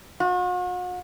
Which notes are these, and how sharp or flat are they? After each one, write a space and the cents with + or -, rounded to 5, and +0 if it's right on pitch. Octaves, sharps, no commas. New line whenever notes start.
F#4 -45